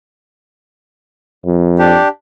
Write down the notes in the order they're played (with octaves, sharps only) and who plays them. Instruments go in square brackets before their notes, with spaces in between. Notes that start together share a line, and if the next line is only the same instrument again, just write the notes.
[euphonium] F2
[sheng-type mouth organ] D4 G4